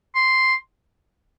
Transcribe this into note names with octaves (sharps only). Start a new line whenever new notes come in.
C6